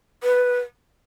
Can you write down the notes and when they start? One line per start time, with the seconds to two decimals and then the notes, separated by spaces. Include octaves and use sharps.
0.23 B4